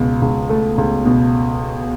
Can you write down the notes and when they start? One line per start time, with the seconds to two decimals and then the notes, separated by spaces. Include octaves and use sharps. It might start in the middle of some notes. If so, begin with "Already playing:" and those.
Already playing: C#2 B2
0.22 C#2
0.49 A3
0.78 C#2
1.05 B2